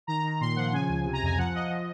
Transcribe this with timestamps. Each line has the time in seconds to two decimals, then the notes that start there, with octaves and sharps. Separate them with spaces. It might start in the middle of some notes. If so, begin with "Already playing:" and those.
0.07 D#3 A#5
0.23 D#3
0.41 A#2 C6
0.56 F3 F#5
0.72 C#3 G#5
0.89 C#2
1.05 C3
1.13 A#5
1.22 F2 G#5
1.37 F3 F#5
1.54 F3 D#5
1.70 F3